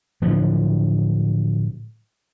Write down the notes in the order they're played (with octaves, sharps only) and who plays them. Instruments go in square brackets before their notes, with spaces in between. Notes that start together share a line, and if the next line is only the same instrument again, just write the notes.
[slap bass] A2 D3 F3 F#3